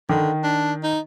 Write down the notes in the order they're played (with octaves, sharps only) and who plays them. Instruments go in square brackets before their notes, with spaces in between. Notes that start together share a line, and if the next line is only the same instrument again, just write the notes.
[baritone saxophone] D3 [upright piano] D#3
[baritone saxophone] D4
D#4